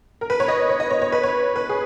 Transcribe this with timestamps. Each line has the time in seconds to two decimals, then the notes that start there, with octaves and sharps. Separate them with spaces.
0.21 A#4
0.30 B4
0.40 C#5
0.48 D#5
0.69 C#5
0.80 D#5
0.91 C#5
1.02 C#5
1.12 B4
1.23 C#5
1.56 B4
1.69 G#4